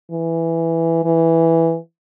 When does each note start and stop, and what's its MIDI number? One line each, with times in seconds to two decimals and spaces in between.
0.11 1.01 52
1.04 1.77 52